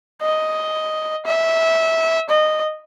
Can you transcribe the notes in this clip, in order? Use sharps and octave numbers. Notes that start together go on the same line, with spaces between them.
D#5
E5
D#5